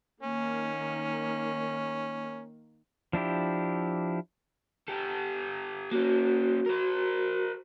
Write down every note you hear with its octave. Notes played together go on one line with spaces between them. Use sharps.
D#3 A#3 C#4
F3 D4 E4 G4
G4 A4
A#3 C#4 F#4
A#4 C5